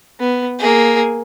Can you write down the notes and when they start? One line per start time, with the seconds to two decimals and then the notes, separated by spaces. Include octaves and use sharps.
0.20 B3
0.59 A#3 G#4